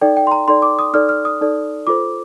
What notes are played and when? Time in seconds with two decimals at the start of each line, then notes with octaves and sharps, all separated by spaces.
0.01 D#4 A4 D5 G5
0.17 G5
0.27 C6
0.32 A#5
0.48 D#4 A4 D5 C6
0.62 D6
0.79 D#6
0.93 D#4 A4 D5 F6
1.09 F6
1.25 D#6
1.41 D#4 A4 D5
1.87 F4 A4 C5 D6